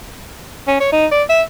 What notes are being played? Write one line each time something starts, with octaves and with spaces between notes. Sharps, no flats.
C#4
C#5
D#4
D5
E5